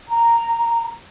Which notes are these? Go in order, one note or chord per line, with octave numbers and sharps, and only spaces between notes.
A#5